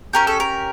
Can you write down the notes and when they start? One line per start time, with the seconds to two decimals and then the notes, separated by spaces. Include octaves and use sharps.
0.13 C#4 G4 A#4
0.27 A4
0.40 A#4